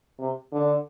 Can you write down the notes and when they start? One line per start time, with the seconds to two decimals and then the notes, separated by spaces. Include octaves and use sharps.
0.19 C3
0.52 D3